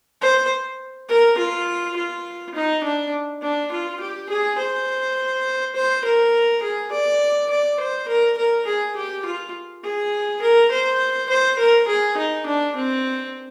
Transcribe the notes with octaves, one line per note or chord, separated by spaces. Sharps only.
C5
A#4
F4
F4
D#4
D4
D4
F4
G4
G#4
C5
C5
A#4
G#4
D5
D5
C5
A#4
A#4
G#4
G4
F4
G#4
A#4
C5
C5
A#4
G#4
D#4
D4
C4